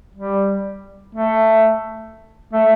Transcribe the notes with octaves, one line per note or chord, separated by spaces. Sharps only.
G3
A3
A3